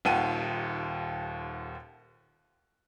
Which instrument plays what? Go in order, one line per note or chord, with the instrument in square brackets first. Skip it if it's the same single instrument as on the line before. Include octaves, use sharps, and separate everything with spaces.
[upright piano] D#1 D#2 F#5 G5 D#7